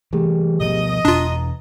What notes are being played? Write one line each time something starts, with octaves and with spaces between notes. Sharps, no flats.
C3 E3 A3 G4 G#4
B2 F3 B3 D#5
E2 B2 D4 F4 A#5